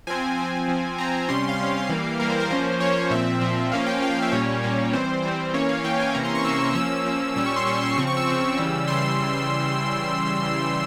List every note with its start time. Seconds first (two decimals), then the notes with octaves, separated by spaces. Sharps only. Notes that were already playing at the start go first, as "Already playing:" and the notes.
0.07 F3 C4 G#5
0.38 F3 C4 G#5
0.68 F3 C4
0.98 F3 C4 A#5
1.29 C3 G3 C#4 C6
1.49 F5
1.59 C3 G3 C#4
1.89 E3 G3 A#3
2.20 E3 G3 A#3 A#4
2.30 C5
2.40 A#4
2.50 F3 A#3 C#4 C5
2.80 F3 A#3 C#4 C#5
3.11 A#2 F3 C4 E5
3.41 A#2 F3 C4
3.72 F3 A#3 C#4 F5
3.86 G5
4.02 F3 A#3 C#4 F5
4.12 F5
4.22 E5
4.32 A#2 G3 A#3 C#4 C#5
4.63 A#2 G3 A#3 C#4
4.93 E3 G3 C4 C5
5.23 E3 G3 C4 C5
5.54 E3 A#3 C#4 C#5
5.69 F5
5.84 E3 A#3 C#4 G5
5.99 G#5
6.15 C3 E3 A#3 C#4 A#5
6.25 C6
6.35 C#6
6.44 C3 E3 A#3 C#4 E6
6.60 C#6
6.75 F3 A#3 C#4 E6
7.05 F3 A#3 C#4
7.36 A#2 G3 C#4 E6
7.46 C#6
7.56 C6
7.66 A#2 G3 C#4 C#6
7.82 C6
7.97 C#3 F3 C4 C#6
8.07 C#6
8.17 E6
8.27 C#3 F3 C4
8.58 C#3 E3 G3
8.87 C#3 E3 G3 C6